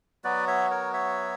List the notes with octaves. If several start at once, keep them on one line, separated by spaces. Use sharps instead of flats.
F#3 B3 F#4 B4 D5
C#5 E5
A#4 C#5
C#5 E5